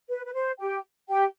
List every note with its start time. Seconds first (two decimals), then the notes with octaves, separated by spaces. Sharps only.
0.08 B4
0.26 B4
0.33 C5
0.59 G4 G5
1.10 G4 G5